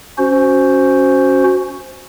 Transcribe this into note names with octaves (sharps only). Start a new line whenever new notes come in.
C#4 F#4 C5